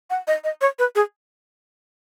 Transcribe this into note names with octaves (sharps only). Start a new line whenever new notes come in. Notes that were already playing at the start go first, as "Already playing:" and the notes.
F#5
D#5
D#5
C#5
B4
G#4